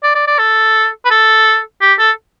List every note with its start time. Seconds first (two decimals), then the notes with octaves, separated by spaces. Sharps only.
0.03 D5
0.15 D5
0.27 D5
0.39 A4
1.05 B4
1.10 A4
1.81 G4
1.99 A4